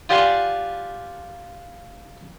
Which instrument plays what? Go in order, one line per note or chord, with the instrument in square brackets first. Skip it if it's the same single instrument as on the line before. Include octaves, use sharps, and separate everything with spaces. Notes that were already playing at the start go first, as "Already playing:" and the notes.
[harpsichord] F4 G4 D5 F#5 G#5 C6